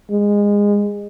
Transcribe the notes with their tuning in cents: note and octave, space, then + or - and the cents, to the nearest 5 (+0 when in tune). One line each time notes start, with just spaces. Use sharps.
G#3 -20